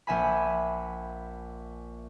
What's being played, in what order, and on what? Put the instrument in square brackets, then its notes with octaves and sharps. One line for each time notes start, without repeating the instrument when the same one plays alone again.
[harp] A#1 E5 G#5 B5